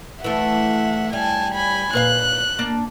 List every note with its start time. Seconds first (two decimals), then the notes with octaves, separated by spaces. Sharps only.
0.24 E3 A3 E5 F#5
1.13 G3 G#5 A5
1.54 G#5 B5
1.93 A#2 B4 F5 F#6
2.59 A#3 D4